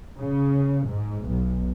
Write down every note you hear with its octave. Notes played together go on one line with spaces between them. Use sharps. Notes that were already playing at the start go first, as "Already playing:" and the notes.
C#3
G#2
B1